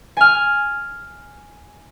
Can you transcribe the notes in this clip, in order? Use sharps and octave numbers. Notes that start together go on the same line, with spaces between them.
G#5 F6